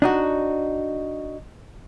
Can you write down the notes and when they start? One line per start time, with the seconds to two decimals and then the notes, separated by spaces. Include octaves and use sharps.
0.02 D4 D#4 F#4